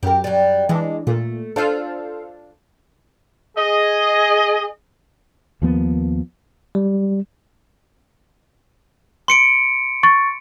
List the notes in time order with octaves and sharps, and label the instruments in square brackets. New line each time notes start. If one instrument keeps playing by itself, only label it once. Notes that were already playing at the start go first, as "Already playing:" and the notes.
[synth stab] F#2 [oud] G4 A#4
[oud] F#3 G3
[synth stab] E3 D4 [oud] G#3
[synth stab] A#2 [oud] A3
[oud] D4 F4 [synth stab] A4 C5 F5
[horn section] G#4 D#5
[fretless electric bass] D#2 F3 A#3 B3
[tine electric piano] G3
[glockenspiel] C6 C#7 D7
[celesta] C#6 A6